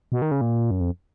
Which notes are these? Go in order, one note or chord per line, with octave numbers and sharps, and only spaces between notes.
B2
D#3
C#3
A#2
F#2
F2